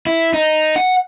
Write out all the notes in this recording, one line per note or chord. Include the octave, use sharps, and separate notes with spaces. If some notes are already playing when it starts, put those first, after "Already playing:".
E4
D#4
F#5